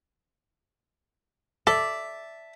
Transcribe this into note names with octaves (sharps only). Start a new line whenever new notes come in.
A4 D5 E5 A5